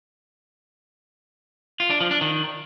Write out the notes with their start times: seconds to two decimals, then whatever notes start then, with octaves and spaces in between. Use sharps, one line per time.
1.80 F4
1.90 D4
2.01 F3
2.11 D4
2.21 D#3